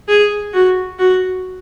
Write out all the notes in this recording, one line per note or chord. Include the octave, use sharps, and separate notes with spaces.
G#4
F#4
F#4